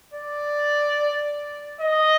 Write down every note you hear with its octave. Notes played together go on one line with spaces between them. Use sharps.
D5
D#5